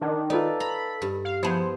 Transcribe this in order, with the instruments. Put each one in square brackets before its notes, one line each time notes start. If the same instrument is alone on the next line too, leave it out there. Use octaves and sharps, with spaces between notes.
[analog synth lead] D#3 [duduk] D4
[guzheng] D#4 [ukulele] F4 B4 D5 [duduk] A4
[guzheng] A#5 [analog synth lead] B5
[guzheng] G2
[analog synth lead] F5
[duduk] F3 [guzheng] B3 E4 [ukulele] G#4 A5 B5 [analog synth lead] C5